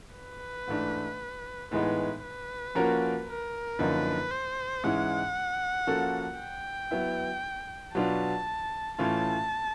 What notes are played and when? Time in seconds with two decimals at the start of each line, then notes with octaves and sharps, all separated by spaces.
0.15 B4
0.68 G#2 E3 A3 D4
1.71 A2 E3 G#3 B3 D#4 B4
2.24 B4
2.75 F3 A#3 C#4 F#4 A#4
3.27 A#4
3.79 F#2 D3 F3 A#3 D#4 B4
4.31 C5
4.84 G#2 E3 G#3 C#4 E4 F#5
5.87 F3 A#3 C#4 F#4 A4
6.39 G5
6.91 F#3 B3 E4
7.95 B2 F#3 B3 D4 F4 A5
8.98 A2 E3 A3 C#4 F4 A5